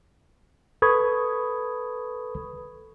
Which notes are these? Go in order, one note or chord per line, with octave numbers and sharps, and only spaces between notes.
A4 B4 B5 C#6 D#6 G#6